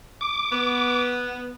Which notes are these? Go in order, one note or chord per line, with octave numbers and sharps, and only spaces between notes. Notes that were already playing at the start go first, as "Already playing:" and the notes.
D6
B3